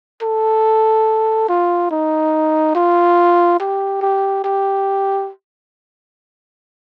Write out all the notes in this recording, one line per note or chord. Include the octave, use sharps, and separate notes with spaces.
A4
F4
D#4
F4
G4
G4
G4